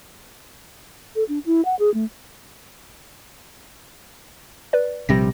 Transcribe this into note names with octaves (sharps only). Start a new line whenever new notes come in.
A4
D4
E4
F#5
G#4
A3
B4 D5
A#1 C3 G3 A#6